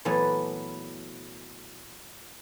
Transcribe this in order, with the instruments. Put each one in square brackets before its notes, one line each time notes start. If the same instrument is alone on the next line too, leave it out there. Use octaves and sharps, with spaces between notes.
[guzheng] A#2 E3 F#3 A3 B3 A4